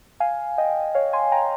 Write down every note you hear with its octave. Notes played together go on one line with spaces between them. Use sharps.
F5 G#5
D#5 G5
C#5 F5
G#5 C6
G5 A#5